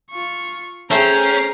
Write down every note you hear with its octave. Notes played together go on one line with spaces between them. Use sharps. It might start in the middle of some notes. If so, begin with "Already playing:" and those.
F4 C#6
A3 C#4 G#4 C5 G5 A#5 C7